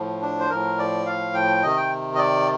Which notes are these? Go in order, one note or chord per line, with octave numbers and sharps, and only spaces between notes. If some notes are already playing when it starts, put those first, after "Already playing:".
Already playing: A2 F3
D4
C5
A2 F3 A#4
D5
F5
G5
C3 D#3 D#5
G5
D#5
D5